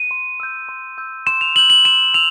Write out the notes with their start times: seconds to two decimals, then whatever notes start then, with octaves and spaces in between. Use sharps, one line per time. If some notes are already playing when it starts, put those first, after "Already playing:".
Already playing: D#7
0.11 C6
0.40 E6 G6
0.69 C6
0.98 E6 G6
1.27 C6 E7
1.41 F7
1.56 E6 G6 F#7
1.70 F#7
1.85 C6 E7
2.14 E6 F7